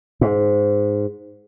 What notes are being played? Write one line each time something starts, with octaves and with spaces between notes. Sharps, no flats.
G#2